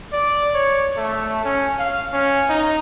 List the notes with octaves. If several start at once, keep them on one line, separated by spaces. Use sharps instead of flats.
D5
C#5
A3
C#4
F5
C#4
D#4